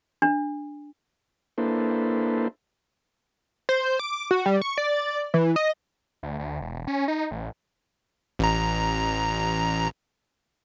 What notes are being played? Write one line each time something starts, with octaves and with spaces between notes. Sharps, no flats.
D4
A#3 D4 E4 A4 B4 C5
C5
D6
F#4
G3
C#6
D5
E3
D#5
D2
D2
E1
C#4
D#4
A1
A1 A#5